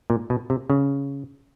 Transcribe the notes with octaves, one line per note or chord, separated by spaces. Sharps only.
A#2
B2
C3
C#3